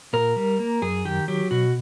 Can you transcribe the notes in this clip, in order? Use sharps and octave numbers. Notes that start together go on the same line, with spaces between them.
A#2 A#4
G3
A#3
F#2 G#4
D#3 G4
F#3 G4
B2 F#4